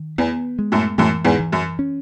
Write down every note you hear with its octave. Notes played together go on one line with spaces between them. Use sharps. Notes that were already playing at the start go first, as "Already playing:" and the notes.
Already playing: D#3
E2 B3
G#3
F#2 A2
F#2 A2 E3
E2 G#2
E3
F#2
C#4